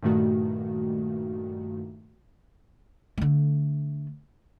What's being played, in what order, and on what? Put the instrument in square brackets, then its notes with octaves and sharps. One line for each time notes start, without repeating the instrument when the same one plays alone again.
[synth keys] G2 A#2 D#3 A3 F#4
[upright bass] D3 A3